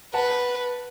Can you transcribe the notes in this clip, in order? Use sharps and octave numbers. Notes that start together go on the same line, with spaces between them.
B4 F#5 A5